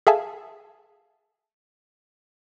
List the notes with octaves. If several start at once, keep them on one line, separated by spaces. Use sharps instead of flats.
G#4 A4 E5 F5 G#5 A5